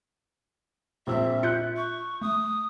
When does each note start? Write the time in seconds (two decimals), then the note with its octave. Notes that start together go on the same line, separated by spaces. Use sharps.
1.07 A#1 C4 E5 E6
1.43 F4 F#6 G6 C#7
1.77 C#6
2.22 A3 D#6